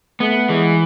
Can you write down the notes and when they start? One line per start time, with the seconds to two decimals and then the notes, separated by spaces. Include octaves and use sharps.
0.20 A3 B3
0.49 E3 G#3